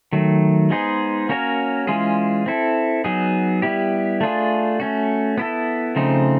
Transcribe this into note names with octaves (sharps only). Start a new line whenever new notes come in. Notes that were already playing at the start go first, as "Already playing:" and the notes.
D#3 F#3 A3
G#3 B3 D#4 G#4 C5
A#3 C#4 F#4 A#4 C#5
E3 G#3 C#4 F4 G#4
C4 E4 A4
F#3 B3 D#4 G#4
G3 B3 E4 G4
A3 D4 F4 G#4
A3 C#4 F#4
B3 E4 A4
C#3 F3 A3 C4 D#4